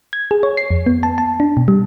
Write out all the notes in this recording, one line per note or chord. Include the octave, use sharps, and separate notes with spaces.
G#6
G#4
C#5
C7
F2
B3
A5
A5
D4
B2
G3